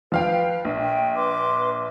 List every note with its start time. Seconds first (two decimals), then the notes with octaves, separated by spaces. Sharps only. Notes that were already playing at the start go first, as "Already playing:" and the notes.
0.12 F3 B4 F5 G5
0.65 A#1
0.80 G5
1.15 B4 C6 D6